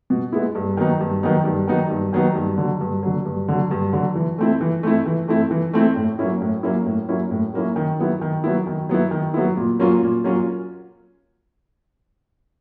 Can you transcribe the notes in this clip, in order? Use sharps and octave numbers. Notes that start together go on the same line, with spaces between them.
B2
G#3 B3 E4
G2
D#3 F#3 B3 D#4
G2
D#3 F#3 B3 D#4
G2
D#3 F#3 B3 D#4
G2
D#3 F#3 B3 D#4
G2
D3 F#3
G2
D3 F#3
G2
D3 F#3
G2
D3 F#3
E3
A3 C4 E4
E3
A3 C4 E4
E3
A3 C4 E4
E3
A3 C4 E4
A2
F#3 A#3 C#4 E4
A2
F#3 A#3 C#4 E4
A2
F#3 A#3 C#4 E4
A2
F#3 A#3 C#4 E4
D#3
F#3 B3 E4
D#3
F#3 B3 E4
D#3
F#3 B3 E4
D#3
F#3 B3 E4
A#2
F#3 A#3 C#4 F4
A#2
F#3 A#3 C#4 F4